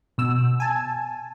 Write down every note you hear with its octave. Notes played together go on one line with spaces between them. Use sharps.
B2 E6
G#5 A5